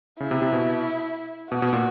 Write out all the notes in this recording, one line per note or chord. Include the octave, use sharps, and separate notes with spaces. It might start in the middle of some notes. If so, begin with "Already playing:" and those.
C#3 E4
C3
C3
B2
B2 F#4
B2
A#2